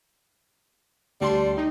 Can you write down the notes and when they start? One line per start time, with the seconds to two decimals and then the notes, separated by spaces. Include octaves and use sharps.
1.21 D2 G3 A5 C6
1.57 D#4